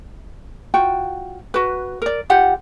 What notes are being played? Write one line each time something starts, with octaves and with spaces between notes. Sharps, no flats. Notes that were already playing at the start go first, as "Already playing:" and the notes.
F4 F#4 G5
F#4 B4
A#4 D5
F4 G4 F#5